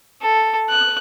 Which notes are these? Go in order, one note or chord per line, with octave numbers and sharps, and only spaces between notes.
A4
F#6